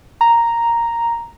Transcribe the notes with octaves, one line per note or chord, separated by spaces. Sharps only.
A#5